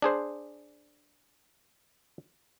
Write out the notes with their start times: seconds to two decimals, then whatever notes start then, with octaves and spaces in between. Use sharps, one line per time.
0.02 D4 G#4 C5